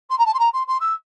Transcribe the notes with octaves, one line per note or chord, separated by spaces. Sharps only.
C6
A#5
A5
C6
A#5
C6
C6
E6